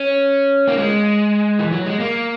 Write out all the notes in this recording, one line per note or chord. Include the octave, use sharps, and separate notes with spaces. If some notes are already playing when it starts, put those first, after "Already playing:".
Already playing: C#4
A#3
G#3
E3
F#3
G#3
A#3